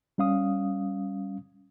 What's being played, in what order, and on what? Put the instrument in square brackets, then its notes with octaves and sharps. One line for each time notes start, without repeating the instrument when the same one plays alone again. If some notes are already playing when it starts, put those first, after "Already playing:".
[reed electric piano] G3 C#4 F5 D#6